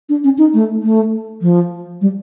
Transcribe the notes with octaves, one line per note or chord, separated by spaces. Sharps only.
D4
C#4
D#4
A3
A3
F3
G3